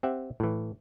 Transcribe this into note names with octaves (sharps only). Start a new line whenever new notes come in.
C4 G4 E5 F#5
A2 E3